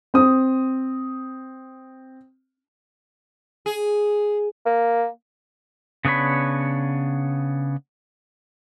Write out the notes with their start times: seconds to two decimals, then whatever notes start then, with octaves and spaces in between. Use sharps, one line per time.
0.14 C4 D#6
3.66 G#4
4.66 A#3
6.05 C#3 B3 D4 C#5 B5